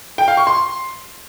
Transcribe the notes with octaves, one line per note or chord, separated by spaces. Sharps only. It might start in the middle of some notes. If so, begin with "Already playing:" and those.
G5
F5
C#6
C6